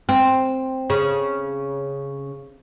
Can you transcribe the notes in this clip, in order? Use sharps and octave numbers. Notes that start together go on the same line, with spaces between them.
C4
C#3